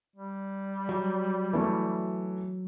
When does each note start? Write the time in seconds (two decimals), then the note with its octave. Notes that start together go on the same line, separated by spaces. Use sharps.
0.16 G3
0.89 F#3
1.53 E3 A3